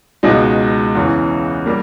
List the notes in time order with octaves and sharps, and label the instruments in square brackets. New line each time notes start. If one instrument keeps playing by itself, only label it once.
[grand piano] C#2 B2 G#3 D#4
E2 C#3 E3
G3 A#3